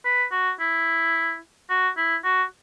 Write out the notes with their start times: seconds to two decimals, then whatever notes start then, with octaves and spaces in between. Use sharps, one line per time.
0.05 B4
0.32 F#4
0.60 E4
1.70 F#4
1.97 E4
2.24 F#4